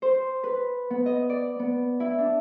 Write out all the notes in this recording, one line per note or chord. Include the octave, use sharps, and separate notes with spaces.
C5
B4
B3
D#5
D5
B3
E4
D4